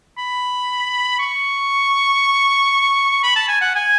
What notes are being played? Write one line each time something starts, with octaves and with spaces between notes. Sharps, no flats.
B5
C#6
B5
A5
G#5
F#5
G#5